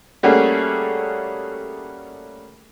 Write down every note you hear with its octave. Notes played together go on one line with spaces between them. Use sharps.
G3 A3 A#3 C#4 F#4 G#4